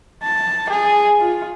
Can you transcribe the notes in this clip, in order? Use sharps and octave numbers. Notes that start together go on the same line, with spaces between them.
A5
G#4
F4